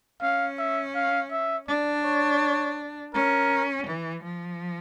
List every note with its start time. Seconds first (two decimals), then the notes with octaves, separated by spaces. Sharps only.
0.21 C#4 F5
0.58 E5
0.95 F5
1.31 E5
1.68 D4 D5
2.04 C#5
3.14 C#4 A#4
3.86 E3
4.23 F3